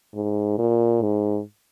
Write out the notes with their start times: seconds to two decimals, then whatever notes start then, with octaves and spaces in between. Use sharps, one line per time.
0.15 G#2
0.58 A#2
1.02 G#2